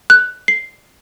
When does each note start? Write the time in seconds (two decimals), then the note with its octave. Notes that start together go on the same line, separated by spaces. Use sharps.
0.10 F#6
0.48 C7